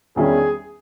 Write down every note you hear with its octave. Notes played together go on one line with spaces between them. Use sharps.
E2 D#3 G3 C#4 E4 G#4